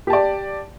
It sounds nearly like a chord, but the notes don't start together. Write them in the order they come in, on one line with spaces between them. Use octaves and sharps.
G4 A5 D5